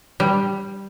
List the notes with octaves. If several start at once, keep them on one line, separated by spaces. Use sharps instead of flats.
G3